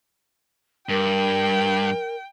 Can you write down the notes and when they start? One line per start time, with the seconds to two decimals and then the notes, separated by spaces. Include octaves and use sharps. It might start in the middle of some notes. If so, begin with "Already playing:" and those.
0.89 G2 A#4 G5